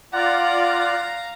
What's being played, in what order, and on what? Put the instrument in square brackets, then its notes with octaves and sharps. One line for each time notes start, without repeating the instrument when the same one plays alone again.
[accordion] F4 D5 [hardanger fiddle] F5 A#5 [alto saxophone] F#5